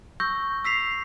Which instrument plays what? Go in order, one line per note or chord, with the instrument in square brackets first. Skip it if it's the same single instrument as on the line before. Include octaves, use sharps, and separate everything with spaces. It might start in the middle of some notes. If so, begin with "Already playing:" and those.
[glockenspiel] C#6 E6 G6 A#6
E6 B6 C7 F7